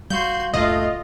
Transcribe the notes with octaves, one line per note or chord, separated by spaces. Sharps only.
G3 F#4 F5 C6 G6
G1 D2 A#2 A3 F4 D#5